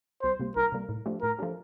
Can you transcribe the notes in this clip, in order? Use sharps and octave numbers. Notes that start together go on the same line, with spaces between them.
C2 C5
C3 G3 A#3
C2 A#4
C3 G3 A#3
A2
F3 A3 D4 G4
A2 A#4
F3 A3 D4 G4